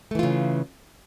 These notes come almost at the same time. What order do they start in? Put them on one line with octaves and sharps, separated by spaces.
A3 E3 F4 C#3